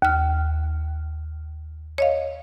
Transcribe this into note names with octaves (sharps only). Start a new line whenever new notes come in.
D#2 F6
C#5 D#5 F5